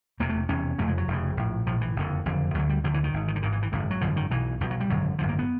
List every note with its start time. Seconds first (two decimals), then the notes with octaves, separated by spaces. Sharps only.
0.20 E1 E2 C3 A#3
0.29 A3
0.49 E1 E2 C3 C#4
0.78 F1 F2 C#3 A3
0.88 G#3
0.98 F#3
1.08 F1 F2 C#3
1.37 A#1 A2
1.67 A#1 A2 F3
1.81 E3
1.96 F#1 F2 D3
2.26 F#1 F2 D3
2.55 D2 D3 F#3
2.69 G3
2.84 D2 D3 F3
2.94 E3
3.04 D#3
3.14 G#1 G#2
3.28 D#3
3.36 D3
3.42 G#1 G#2 D#3
3.52 E3
3.62 E3
3.72 G#1 F#2 D3
3.91 F#3
4.01 G#1 F#2 D3 F3
4.16 D#3
4.31 B1 B2 E3
4.60 B1 B2 F3
4.71 F#3
4.80 G3
4.90 G#1 F#2 D3 F#3
5.19 G#1 F#2 D3 F3
5.29 A#3
5.39 B3